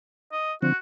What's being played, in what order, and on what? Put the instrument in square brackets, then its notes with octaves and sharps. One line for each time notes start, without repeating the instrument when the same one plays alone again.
[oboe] D#5
[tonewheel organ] D3 F3 C4 [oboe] F#4